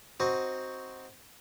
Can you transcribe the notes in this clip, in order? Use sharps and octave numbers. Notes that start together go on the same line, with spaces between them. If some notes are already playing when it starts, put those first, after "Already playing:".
C4 D#4 F#4